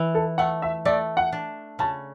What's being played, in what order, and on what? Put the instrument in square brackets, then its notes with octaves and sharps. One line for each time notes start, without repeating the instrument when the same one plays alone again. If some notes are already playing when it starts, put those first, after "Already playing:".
Already playing: [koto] E3
[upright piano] A4
[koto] A3 [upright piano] F#5
[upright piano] E5
[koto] A3 [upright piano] D5
[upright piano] F#5
[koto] D4
[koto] C#3 [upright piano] A5